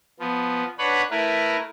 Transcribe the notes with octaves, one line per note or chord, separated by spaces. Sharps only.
F3 B3
D4 B4 C#5 F#5 B5
A3 E4 A#4 B4